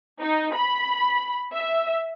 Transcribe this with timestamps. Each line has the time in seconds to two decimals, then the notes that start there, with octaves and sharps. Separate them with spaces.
0.21 D#4
0.54 B5
1.55 E5